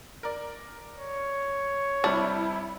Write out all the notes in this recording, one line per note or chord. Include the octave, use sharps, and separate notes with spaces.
A#4 D5
C#5
C3 G3 D4 E4